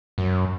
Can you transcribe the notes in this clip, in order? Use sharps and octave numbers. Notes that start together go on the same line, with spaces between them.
F#2